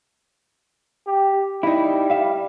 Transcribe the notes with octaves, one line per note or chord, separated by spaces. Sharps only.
G4
G3 D#4 E4
E5 F5